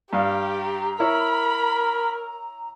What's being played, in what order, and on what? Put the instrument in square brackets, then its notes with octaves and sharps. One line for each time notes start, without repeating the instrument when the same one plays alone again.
[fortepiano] G2 F5 [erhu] G4 [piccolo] A#5
[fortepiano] E4 C#5 C#6 [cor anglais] A#4 [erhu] B5